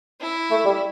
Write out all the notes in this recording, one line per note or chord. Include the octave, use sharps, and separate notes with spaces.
E4
A3
G3